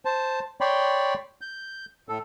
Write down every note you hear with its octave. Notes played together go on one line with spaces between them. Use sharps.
C5 A5
C#5 D5 G5 B5 C6
G6
A2 A4